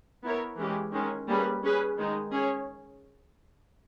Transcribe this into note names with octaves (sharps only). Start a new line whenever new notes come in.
B3 E4 A#4 C#5
E3 G#3 C#4 G4
D#3 G#3 C#4
G3 A#3 C#4 G#4 B4
C#4 G#4 B4
D#3 G#3 D#4
C#4 G#4 C#5